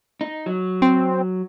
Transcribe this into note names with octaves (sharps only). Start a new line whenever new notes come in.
D#4
F#3
C4